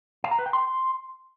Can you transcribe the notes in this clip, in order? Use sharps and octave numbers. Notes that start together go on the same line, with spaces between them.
F5
A#5
B4
G5
C6